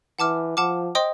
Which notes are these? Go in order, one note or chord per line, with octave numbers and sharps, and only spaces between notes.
E3 F#5 A5 D6 F6
F3 F#5 A5 D6 F6
C5 D#5 G5 C6 D#6